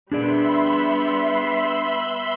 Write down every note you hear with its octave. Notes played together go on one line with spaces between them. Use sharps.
G3 B3 D4 G#4 D5 E5 B5 C6